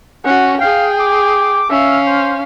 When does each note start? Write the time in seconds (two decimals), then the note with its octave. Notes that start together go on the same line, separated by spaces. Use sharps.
0.25 C#4 F#4 F#5
0.61 G#4 F5 G5
1.00 D6
1.70 C#4 E5 F5
2.06 C5